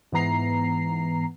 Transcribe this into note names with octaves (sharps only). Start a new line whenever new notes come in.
G#2 E3 B3 A#5 C7